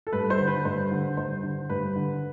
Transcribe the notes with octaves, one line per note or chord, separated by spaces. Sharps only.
A4
G2 B4
C5
D3
B4
G2 C5
D3
G2 C5
D3
G2 B4
D3